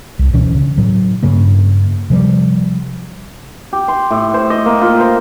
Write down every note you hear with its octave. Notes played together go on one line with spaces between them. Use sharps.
C2
D1 B2 E3 C#4
C#3
A2 F#3
G2 C#3 A#3
C3 F3 G3
G4
C6
A2
C5
D#5
A#3
F4
C5